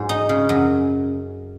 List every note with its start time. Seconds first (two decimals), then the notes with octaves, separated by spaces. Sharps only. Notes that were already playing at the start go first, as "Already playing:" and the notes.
Already playing: G#2 F#3
0.09 D#4
0.29 C#3
0.49 F#2